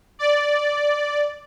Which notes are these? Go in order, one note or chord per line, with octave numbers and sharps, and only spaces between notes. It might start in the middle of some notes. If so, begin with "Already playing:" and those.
D5